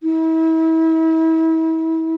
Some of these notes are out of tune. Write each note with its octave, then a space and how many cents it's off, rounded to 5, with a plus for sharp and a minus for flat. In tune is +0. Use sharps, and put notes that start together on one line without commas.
E4 -35